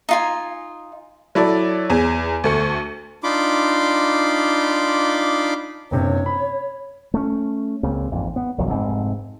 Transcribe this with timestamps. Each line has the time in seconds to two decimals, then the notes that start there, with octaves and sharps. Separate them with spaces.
0.09 D#4 F4 G#5
1.35 F#3 E4 A4 D5
1.90 E2 G#4 G#5
2.44 D2 A3 C#7
3.24 D4 D#4 F4 B5 C6 D6
5.91 F#1 G2 C3 C#5
6.26 B5
7.14 A3 C#4
7.83 C#2 C#3 A#3 C4
8.11 A1 F2 G#2
8.36 B3
8.58 E1 C2 F2 F#3
8.70 F1 G#2 C4